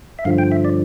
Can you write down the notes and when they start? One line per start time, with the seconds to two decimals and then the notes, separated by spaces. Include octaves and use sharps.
0.19 E5
0.25 G2 D3 F3 F5
0.38 G5
0.52 E5
0.65 D5